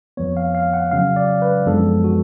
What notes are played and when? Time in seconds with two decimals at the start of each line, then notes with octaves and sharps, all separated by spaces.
0.17 F2 F3 B3 C#5
0.37 F5
0.54 F5
0.74 F#5
0.92 C#3 F#3 C#4 F5
1.16 D5
1.42 B4
1.66 F#2 F3 G#3 B3 D4 A4
2.04 F#4